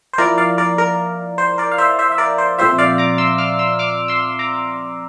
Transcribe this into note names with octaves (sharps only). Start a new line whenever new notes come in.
C5
F3 A#3 E4 A#4 D5
D5 F5
A#4 D5
A#4
C5
A#4 D5
F5
C5 E5
C5 E5
E5
A#4 D5
C5
A#2 F3 A3 C4 F4 C5 E5
D5 F5
A#5 D6
C6 E6
D6 F6
C6 E6
D6 F6
C6 E6
A#5 D6